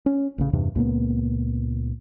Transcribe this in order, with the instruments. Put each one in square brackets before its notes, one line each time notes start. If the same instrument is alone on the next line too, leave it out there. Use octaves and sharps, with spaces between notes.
[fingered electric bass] C#4
A1 C#3
E2 G2 C3
C#2 A#2 A#3 B3